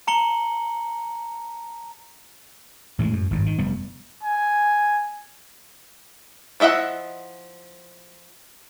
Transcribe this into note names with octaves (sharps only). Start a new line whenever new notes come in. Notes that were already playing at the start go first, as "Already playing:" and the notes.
A5 A#5 C#7 F#7 G7
A2 E3 G3 G#3
F#2
G#1 G2
D#3
F1 G3 B3
G#5
F3 E4 D#5 E5 F#5